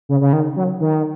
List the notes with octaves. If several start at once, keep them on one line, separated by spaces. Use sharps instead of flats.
C#3
C#3
D#3
F#3
D#3